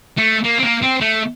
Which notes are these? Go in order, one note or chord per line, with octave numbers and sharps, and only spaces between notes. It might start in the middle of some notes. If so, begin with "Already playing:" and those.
A3
A#3
C4
A#3
C4
A3